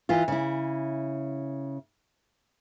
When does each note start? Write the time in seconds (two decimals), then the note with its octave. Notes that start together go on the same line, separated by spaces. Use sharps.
0.09 E3 F4
0.28 C#3 E4